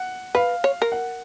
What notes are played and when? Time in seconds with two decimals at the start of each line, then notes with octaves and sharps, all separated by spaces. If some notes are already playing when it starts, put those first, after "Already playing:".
Already playing: F#5
0.35 B4 F5
0.64 C#5
0.82 A#4
0.92 F#5